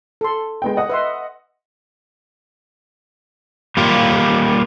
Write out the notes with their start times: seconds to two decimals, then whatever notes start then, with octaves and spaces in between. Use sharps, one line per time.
0.21 A4 C6
0.62 G#3 B3 G5
0.77 D#5 F#5 D#6
0.89 B4 E5 C6
3.77 G3 A#3 F4 G4